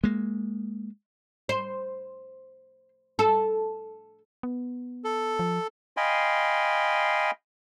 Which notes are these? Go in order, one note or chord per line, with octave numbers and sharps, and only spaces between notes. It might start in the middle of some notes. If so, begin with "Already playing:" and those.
G#3 A#3
C5
A4
B3
A4
F3
D#5 F5 G5 G#5 B5 C6